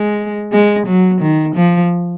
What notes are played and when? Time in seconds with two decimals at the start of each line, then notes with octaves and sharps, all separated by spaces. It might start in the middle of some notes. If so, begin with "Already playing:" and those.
Already playing: G#3
0.52 G#3
0.87 F#3
1.21 D#3
1.55 F3